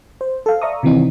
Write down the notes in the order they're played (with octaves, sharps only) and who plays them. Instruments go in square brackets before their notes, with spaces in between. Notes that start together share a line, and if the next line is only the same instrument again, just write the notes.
[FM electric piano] C5
A4 F5
D5 E5 A#5 C#6 D#6
C3 D#3 E3 C4 D#4 E4